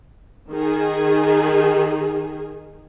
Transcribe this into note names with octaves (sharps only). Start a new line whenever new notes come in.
D#3 G#4